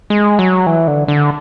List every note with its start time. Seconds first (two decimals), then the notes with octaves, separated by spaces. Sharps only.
0.10 G#3
0.39 F#3
0.66 E3
0.87 D3
1.08 D3